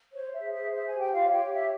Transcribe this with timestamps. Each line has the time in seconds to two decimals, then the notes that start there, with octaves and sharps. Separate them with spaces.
0.12 C5 C#5
0.32 E5
0.40 G#4
0.52 E5
0.66 C5
0.72 E5
0.86 G#5
0.93 G4
0.98 G5
1.11 F4 F5
1.18 C#5
1.32 G4 G5
1.45 G4
1.51 E5